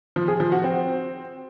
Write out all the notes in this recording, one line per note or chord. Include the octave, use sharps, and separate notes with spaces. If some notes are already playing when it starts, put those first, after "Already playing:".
F3
G#4
F3
F#4
C4